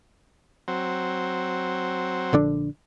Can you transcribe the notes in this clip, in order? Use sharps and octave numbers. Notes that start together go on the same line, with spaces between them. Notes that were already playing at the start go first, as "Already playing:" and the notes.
F#3 C4
A#1 D3 D4